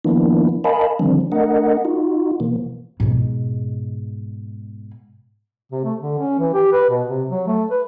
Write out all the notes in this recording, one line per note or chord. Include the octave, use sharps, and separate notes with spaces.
D#3 F3 A#3 B3 D4 E4
A#4 D#5 F5 G#5 A5 B5
D3 D#3 F3 G3 C4 D4
A3 D4 A#4 D#5 F#5
D#4 F4 F#4
B2 E3 A#3
G#2 B2
C3
A3
D3
C#4
E3
G4
B4
B2
C3
F#3
A3
B4